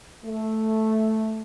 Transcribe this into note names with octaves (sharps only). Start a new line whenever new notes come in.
A3